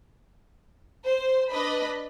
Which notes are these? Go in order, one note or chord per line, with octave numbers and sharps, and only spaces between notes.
C5
D4 B4 D#5 B5